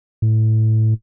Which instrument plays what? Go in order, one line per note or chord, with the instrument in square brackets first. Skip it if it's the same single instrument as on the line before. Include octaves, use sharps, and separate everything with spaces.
[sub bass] A2